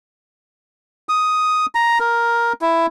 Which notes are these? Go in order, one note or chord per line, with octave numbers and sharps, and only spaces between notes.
D#6
A#5
A#4
E4